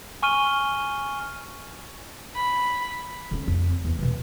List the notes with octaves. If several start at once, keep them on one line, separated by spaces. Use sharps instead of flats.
G#5 C#6 F6 D#7 G7
B5
D3 C#4
F2
E2
B2 E3